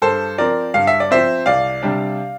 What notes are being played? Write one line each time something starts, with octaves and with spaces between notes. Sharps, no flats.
G2 A4 C5
F3 C4 A#4 D5
G2 F5
E5
D5
F3 C4 C5 E5
C2 D5 F5
C3 G3 D4